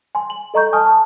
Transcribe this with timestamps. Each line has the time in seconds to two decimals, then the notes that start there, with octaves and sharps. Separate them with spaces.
0.15 G#5 C6
0.30 F#7
0.54 A4 D#5 A#5 C#6 G6
0.73 G#5 A5 C#6 D#6 F6
0.86 A5